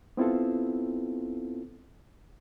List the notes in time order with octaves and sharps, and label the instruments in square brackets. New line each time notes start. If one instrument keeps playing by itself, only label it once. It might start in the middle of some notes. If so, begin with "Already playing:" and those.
[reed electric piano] B3 C4 E4 F4 A4